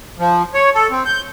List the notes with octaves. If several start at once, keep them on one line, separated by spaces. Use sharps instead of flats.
F3
C#5
A4
C4
G6